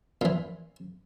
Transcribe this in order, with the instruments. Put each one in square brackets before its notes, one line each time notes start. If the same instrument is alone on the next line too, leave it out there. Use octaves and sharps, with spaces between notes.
[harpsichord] A#2 E3